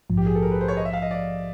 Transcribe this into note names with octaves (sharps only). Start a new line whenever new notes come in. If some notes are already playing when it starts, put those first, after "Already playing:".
A#1 G#2 F3
G4
G#4
A4
A#4
B4
C5
C#5
D#5
E5
F5
D#5
D5